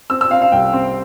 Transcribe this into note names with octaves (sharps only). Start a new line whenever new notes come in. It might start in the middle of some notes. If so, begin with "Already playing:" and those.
C4 E6
E6
C4 F5
F5
C2 G5
C4